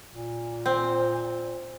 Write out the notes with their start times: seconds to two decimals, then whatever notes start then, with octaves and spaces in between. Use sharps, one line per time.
0.13 A#2
0.66 C4